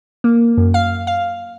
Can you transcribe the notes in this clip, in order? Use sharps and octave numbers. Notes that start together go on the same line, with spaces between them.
A#3
F#2
F5
F5